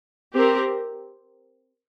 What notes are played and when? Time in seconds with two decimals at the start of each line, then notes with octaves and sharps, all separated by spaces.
0.35 C4 G4 A#4